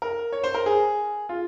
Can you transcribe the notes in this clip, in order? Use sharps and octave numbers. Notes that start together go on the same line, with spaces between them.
A#4
C#5
C5
A#4
G#4
F4